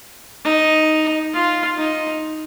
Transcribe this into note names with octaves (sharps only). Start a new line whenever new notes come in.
D#4
F4
D#4